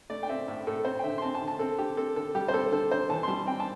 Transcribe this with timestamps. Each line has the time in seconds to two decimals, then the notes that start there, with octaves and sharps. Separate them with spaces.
0.10 A3 D5
0.23 G5
0.29 C4 E5
0.48 A2 E5
0.67 A2 A4
0.85 C4 C5
0.99 G5
1.04 D3 E5
1.18 C6
1.22 C4 A5
1.35 A5
1.42 D3
1.48 A5
1.59 C4 A4
1.78 D3 G4
1.97 C4 A4
2.16 D3 A4
2.35 G3 G4
2.48 C5
2.54 C4 A4
2.72 D3 A4
2.91 D3 C5
3.09 E3 A5
3.23 C6
3.28 G3 A5
3.46 C4 G5
3.60 A5